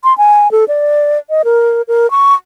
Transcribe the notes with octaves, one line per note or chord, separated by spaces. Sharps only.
C6
G#5
A4
D5
D#5
A#4
A#4
C#6